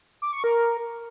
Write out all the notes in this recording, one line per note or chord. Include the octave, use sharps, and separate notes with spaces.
D6
C#6
A#4